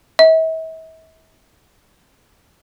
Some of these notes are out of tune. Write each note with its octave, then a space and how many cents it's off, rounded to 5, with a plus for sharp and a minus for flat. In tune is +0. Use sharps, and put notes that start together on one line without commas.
E5 -40